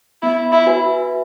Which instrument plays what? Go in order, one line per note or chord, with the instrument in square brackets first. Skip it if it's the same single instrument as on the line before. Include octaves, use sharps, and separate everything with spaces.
[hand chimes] B3 [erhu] E4
[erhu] E4
[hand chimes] F#4 B4 E5 G#5